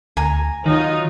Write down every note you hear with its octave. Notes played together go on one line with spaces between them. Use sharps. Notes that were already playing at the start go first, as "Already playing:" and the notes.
D2 G#5 A#5
D#3 F#3 D#4 F4